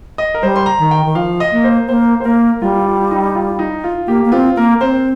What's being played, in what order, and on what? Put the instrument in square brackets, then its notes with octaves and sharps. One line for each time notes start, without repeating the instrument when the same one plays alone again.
[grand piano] D#5
A#4
[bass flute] G3 [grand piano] C5
[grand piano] C6
A#5
[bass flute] D#3
[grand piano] G5
[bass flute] D#3
[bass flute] F3 [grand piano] F5
[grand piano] D#5
[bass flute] A#3
[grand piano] C5
[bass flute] A#3 [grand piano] C5
[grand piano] C5
[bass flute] A#3 [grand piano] A#4
[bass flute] G3 [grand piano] F4
[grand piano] F4
D#4
F4
D#4
F4
[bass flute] A#3 [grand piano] G4
[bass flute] A#3
[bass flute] C4 [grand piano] F4
[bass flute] A#3 [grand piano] A#4
[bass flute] C4 [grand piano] C5